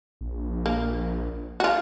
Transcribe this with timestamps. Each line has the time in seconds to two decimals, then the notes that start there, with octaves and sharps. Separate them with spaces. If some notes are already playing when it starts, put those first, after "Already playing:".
0.21 A#1
0.66 A#3
1.60 F4 F#4